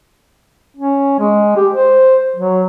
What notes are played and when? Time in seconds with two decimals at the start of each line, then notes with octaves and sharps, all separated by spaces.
0.76 C#4
1.19 G#3
1.56 G4
1.73 C5
2.36 F#3